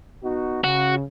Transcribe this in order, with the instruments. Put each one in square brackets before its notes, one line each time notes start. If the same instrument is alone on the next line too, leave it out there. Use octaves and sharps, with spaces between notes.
[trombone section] B3 D#4 F#4
[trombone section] C#3 [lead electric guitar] F#4